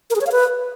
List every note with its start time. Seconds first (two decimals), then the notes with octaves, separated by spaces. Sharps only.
0.10 A#4
0.16 G#4
0.21 C#5
0.26 F5
0.32 B4